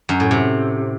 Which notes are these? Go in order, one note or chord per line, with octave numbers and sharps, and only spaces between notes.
F#2
A2
C3